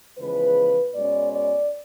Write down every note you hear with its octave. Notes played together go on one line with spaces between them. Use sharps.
E2 C#3 F3 G#3 B4
B2 G#3 C#4 D5
D5